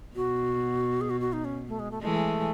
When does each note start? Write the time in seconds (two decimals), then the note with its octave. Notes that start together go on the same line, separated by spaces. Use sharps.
0.16 B2 F#4
1.01 G#4
1.10 F#4
1.21 F#4
1.33 D#4
1.45 C#4
1.68 A3
1.79 G#3
1.91 A3
2.02 E3 G#3 A3